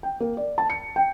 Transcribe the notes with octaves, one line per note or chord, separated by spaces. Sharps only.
G5
A#3
D5
A5
C#7
G5